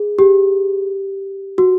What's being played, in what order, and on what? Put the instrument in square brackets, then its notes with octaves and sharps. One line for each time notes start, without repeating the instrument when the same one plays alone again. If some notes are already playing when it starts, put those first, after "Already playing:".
Already playing: [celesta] G#4
G4
F#4